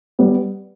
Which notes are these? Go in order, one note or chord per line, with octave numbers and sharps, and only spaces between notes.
G3 B3